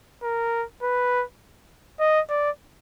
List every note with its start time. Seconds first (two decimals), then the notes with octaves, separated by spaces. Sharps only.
0.23 A#4
0.83 B4
2.00 D#5
2.30 D5